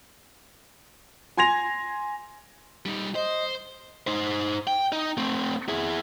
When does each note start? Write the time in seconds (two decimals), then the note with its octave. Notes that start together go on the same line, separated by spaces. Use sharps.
1.37 G#5 C6 G#6 A#6 F7
2.86 G3 D#4
3.15 C5 D#5
4.07 D#4 C5
4.67 G5
4.92 D#4
5.17 A3 C4
5.69 E4 G#4